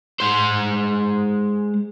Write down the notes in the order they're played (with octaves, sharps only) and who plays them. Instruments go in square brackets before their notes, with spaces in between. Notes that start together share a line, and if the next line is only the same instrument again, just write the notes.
[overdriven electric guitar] G#3 C5